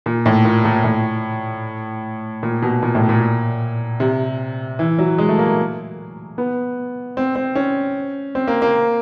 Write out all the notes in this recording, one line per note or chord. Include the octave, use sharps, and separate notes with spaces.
A#2
A2
A#2
A#2
A2
A#2
B2
A#2
A2
A#2
C3
E3
F#3
G#3
A3
A#3
B3
C4
C4
C#4
C4
A#3
A#3